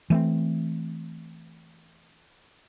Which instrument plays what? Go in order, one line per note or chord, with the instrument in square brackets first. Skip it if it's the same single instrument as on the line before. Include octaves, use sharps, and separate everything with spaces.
[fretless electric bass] E3 A3 B3 C4